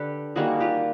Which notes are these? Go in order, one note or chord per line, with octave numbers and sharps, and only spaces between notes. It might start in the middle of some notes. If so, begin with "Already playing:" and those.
Already playing: D3 G4 A4 B4
D#3 G3 A#3 F#4 G#4
F4 G4